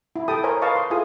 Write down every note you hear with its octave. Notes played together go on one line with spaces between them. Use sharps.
E4
G4 A4 G5 A5 D#6
A#4 C5 C#5 G#5 A#5
B4 D#5 F5 A5 C#6 D6
C5 C6
E4 F4 G#4 A4 G#5 D#6